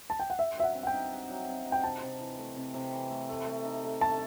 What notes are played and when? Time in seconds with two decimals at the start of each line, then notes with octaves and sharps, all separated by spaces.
0.10 A5
0.20 G5
0.30 F#5
0.39 G4 E5
0.57 F#3 E5
0.63 F#5
0.75 C4
0.83 F#5
0.87 G5
0.94 D#4
1.12 G4
1.29 F#3
1.48 C4
1.66 D#4
1.72 G5
1.83 C3 A5
2.02 C3
2.20 E3
2.38 A3
2.57 C3
2.74 C3
2.93 E3
3.10 A3
3.29 A3
3.46 A3
3.65 D#4
3.83 A4
4.01 A3 A5